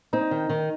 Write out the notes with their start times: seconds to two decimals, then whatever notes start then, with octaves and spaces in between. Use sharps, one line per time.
0.13 C4 D#4
0.31 D#3
0.49 D#3